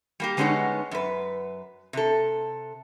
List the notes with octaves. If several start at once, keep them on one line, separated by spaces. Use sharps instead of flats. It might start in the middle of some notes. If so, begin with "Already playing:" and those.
G3 A#3 G4
D3 G#3 B3 C#4 D#4 C#5
F#2 B4
C3 A4